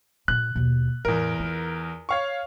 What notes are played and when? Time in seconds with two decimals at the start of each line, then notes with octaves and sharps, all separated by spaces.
0.28 A#2 D3 F#6
0.56 D#2 B2
1.05 E2 A2 A#4
1.40 F4
2.09 C#5 F5 C#6